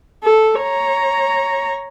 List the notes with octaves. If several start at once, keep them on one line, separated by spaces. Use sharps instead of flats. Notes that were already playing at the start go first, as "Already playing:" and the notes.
A4
C#5 A#5